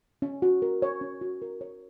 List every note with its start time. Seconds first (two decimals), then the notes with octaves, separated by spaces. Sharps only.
0.22 C#4
0.42 F#4
0.62 A#4
0.82 C#5
1.01 C#4
1.21 F#4
1.42 A#4
1.61 C#5